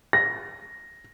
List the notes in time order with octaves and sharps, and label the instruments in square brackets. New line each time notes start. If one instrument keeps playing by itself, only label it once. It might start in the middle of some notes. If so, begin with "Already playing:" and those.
[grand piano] A#6